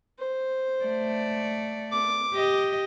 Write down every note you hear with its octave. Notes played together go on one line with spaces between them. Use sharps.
C5
A3 D5
D6
G4 D#5